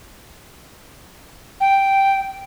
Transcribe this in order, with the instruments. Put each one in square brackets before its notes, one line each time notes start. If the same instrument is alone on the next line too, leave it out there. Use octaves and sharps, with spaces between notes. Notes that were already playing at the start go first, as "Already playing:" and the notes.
[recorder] G5